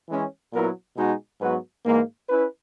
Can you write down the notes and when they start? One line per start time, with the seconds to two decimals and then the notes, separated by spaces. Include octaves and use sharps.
0.09 E3 G#3 C#4
0.52 A#2 F#3 B3 E4 A#4
0.96 B2 G#3 D#4 F#4
1.41 G#2 F#3 B3 F#4 B4
1.86 G#2 E3 A#3
2.29 C#4 E4 B4